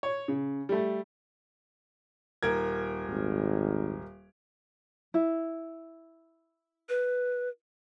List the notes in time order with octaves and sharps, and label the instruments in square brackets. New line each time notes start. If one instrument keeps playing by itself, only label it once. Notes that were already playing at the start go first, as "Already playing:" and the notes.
[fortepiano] C#5
C#3
G3 A3
[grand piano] D#1 A#4 G#6
[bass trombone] G#1
[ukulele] E4
[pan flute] B4